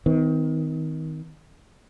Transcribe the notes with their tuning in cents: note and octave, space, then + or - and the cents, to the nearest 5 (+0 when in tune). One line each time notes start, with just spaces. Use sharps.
D#3 +25 C4 -40